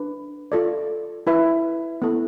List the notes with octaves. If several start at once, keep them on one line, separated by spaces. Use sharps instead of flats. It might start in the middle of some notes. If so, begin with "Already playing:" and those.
Already playing: D4 B4
F4 A4 D5
E4 B4 E5
B3 E4 A4